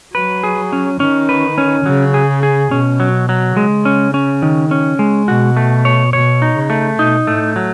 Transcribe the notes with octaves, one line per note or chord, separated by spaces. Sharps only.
F#3 B4
G#4
C#4
D#3 C#4
B4
C#4
C#3 F#3
G#4
G#4
B2 C#4
F#3
F#3
C#3 G#3
C#4
C#4
D#3
C#4
G#3
B2 F#4
A3
C#5
B2 C#5
D#4
C#3
A3
B2 D#4
A2 A3
F#3